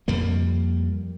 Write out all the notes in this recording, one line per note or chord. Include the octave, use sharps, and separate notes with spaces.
F2 G3 A#3